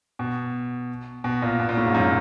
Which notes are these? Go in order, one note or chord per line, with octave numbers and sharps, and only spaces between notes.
B2
B2
A#2
B2
A#2
A2
G#2
F#2